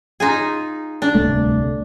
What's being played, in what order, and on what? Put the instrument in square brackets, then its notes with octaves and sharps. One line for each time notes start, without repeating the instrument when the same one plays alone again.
[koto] D#4 F4 G#4
D4
[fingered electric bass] D1 C2 A3